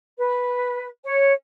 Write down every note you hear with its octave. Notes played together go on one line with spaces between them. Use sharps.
B4
C#5